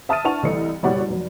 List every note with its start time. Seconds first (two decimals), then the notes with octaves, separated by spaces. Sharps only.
0.09 E5 A5 D#6 F6 A6 D#7
0.24 D4 E4 F#5 A5 C#6 F7
0.43 C2 E3 A3 D#5 C#7
0.83 F#1 B2 G3 C#5 D5 F#5
1.08 F1 F#3